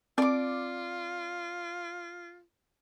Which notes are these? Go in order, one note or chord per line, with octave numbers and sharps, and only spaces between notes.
C4 F4 D5 D6